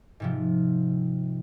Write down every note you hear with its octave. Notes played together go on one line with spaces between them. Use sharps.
G#2 C3 F3